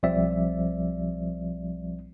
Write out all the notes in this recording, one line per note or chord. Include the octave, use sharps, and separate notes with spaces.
B1 F3 G3 C4 D5 E5